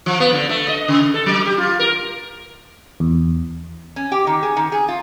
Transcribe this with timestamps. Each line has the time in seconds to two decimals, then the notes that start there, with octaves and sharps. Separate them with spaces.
0.06 F3
0.20 B3
0.33 D3
0.49 A3
0.68 D#5
0.88 C#3
1.14 A4
1.26 F#3
1.45 G4
1.58 F4
1.79 A#4
3.00 E2
3.96 C#4
4.12 G4
4.27 D#3
4.43 G#4
4.57 D#3
4.72 G#4
4.88 F4